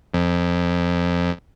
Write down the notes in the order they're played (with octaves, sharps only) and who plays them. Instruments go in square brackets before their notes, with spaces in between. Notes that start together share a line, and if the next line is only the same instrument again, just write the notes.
[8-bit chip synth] F2